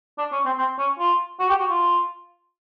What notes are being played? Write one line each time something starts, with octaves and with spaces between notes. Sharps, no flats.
D4
C#4
C4
C4
C#4
F4
F#4
G4
F#4
F4